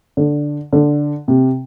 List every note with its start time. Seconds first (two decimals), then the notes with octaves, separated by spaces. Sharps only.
0.17 D3
0.73 D3
1.28 C3